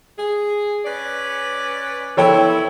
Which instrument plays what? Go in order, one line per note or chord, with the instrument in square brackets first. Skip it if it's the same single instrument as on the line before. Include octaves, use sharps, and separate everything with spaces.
[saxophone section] G#4
C#4 B4 D5
[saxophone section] B3 C4 E4 [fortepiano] A4 C#5 G5